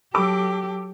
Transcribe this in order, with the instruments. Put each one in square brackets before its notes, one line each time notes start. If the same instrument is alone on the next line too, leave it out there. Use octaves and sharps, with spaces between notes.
[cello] F#3 G4 [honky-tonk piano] A4 D6